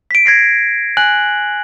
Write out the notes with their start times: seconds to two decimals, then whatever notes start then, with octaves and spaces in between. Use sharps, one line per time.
0.11 B6 D7
0.26 G#6 A#6 C7
0.97 G#5 F#6 F#7